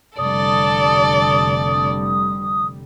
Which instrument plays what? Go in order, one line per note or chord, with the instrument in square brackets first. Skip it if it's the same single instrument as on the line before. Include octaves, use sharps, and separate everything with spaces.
[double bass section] F1 D3 G3 [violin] A4 D5 [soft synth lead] D#6